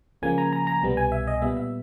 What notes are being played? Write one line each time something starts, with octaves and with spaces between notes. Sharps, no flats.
C#2 C#3 F3 A#3 G#5
A#5
A#5
A#5
C2 B2 G3 B3
G#5
E5
D#5
A#2 G3 B3 E5
E5